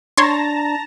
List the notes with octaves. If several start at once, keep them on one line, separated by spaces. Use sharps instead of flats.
D4 C#5 A5 A#5 C6 A#6